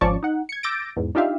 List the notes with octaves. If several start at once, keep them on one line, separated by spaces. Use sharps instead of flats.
G#1 F3 C#4 D5 A5 C#6
D#4 F#5
G#6 C#7
D6 E6 G6 A6 A#6 D7
E2 G#2
D4 D#4 F4 G4 E5 F5